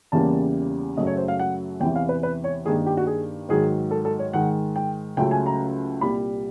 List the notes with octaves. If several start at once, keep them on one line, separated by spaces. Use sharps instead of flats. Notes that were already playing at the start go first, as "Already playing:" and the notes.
E2 C#3 E3 G3 A#3 A5
F#2 C#3 F#3 A3 D#5
C#5
C5
F5
F#5
E2 C3 E3 G5
F5
B4
B4
C#5
G2 D#3 G3 A#3 G#4
G4
F#4
G#4
G#2 D#3 F#3 G#4
A4
A4
C#5
G#2 D#3 G#3 F#5
G5
C#2 C#3 F#3 A3 G5
G#5
A#5
C2 A#2 G3 B5